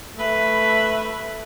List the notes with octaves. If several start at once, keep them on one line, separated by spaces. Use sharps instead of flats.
A3 B4 E5